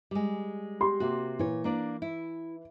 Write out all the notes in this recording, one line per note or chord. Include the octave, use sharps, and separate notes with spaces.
G3 G#3
G4 C6
C3 A#3 F#4
A#2 E3 C#5
A#3 D4 D5
E4